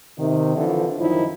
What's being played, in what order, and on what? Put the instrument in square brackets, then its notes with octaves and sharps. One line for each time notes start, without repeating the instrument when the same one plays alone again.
[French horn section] C3 D#3
D3 E3 F3
F#2 D#3 F3 D#4 E4